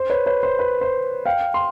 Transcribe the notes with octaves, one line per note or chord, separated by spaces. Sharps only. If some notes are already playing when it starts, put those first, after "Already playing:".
Already playing: C5
B4 C#5
B4 C#5
C5
B4
C5
F5 G5
C6